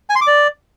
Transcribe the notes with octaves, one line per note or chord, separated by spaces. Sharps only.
G#5
C6
D6
D5